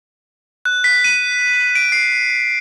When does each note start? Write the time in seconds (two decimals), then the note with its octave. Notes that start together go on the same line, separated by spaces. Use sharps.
0.65 F#6
0.84 B6
1.04 D#7
1.75 D7
1.92 C7